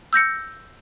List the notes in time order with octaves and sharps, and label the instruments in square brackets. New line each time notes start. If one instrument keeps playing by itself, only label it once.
[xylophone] E6 G6 A#6 C#7